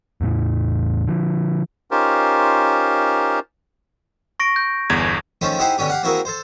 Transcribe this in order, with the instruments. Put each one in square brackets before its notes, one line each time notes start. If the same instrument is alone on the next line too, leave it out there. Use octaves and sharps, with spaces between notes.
[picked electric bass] E2 A2 E3
D3 F3
[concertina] C#4 D#4 F4 G4 A#4 C5
[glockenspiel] C#6 A#6 D7
G6
[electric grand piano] G1 E2 G#6
[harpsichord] D#3 F3 A3 C#4 C5
D#4 E4 G4 G#4 C5 F#5
B2 D3 C#4 G4
G4 F5 F#5
A#3 C4 E4 F#4 G#4 A#4
A4 C5